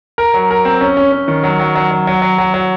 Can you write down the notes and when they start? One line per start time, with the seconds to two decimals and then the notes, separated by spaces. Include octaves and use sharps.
0.18 A#4
0.34 F#3
0.51 A#4
0.65 C4
0.81 C#4
0.97 C#4
1.12 C#4
1.28 D#3
1.43 F#3
1.59 F#3
1.75 F#3
1.91 F#3
2.07 F#3
2.22 F#3
2.38 F#3
2.54 F#3